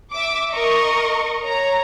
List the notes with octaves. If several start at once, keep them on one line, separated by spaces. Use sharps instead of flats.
E5 D6
A#4 D#5 C#6
C#5 A#5